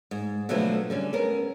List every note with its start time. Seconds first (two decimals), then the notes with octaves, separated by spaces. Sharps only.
0.11 G#2
0.49 B2 D3 F3 F#3 A3 B3
0.90 D3 G3 C#4
1.13 B3 C#4 A#4